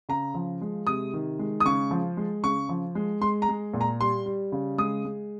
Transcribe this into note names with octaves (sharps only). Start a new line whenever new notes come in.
C#3 A#5
F3
G#3
C3 D#6
D#3
G#3
D#6
C#3 C#6
F3
G#3
C#3 C#6
F3
G#3
G#3 C6
A#5
G#3
A#2
A#5
G3 C6
G3
C#3
G#3 D#6
G#3